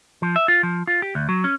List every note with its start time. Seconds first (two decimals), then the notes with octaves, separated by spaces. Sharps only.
0.22 F3
0.36 E5
0.48 F4
0.63 F3
0.87 F4
1.02 G4
1.15 D2
1.29 F#3
1.44 C#4